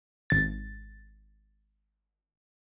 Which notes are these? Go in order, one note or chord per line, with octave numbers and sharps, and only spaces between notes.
G#1 A6